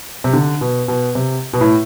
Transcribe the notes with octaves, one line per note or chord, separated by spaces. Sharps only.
C3
D3
B2
B2
C3
B2
A2